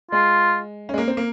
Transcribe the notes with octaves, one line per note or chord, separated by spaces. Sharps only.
G#3 F4
G#3 C#4
A#3
C4
A#3